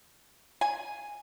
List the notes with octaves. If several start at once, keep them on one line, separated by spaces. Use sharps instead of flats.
G#5